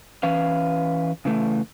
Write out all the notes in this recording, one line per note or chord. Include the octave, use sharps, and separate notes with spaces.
E3 C#4 B4 F5
C#3 E3 A3